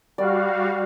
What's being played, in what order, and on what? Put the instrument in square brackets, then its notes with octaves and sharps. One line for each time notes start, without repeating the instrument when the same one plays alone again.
[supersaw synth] G3 F#4 F5 [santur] D5